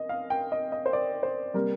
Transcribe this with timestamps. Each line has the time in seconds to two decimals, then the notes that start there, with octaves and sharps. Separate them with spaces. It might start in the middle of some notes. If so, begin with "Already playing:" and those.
Already playing: D#5
0.09 F5
0.30 G5
0.52 D#5
0.72 D#5
0.86 C5
0.93 D5
1.23 C5
1.54 C3 G3 A#3 A#4